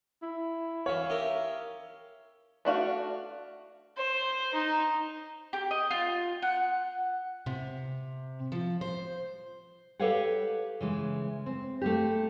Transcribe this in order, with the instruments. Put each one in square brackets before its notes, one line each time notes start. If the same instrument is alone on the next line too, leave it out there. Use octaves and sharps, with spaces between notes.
[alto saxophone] E4
[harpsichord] E3 B5 [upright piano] C#5 [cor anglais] F5
[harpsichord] D#4 G4 A#4 [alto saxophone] E5
[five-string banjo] A3 D4 F#4 F5
[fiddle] C5
D#4
[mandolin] G4
D#5
F4
F#5
[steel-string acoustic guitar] C3
F3
C5
[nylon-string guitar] G4 A4 B4 C#5 F5 F#5
C#3 E3 G#3
C4
A3 A#3 G4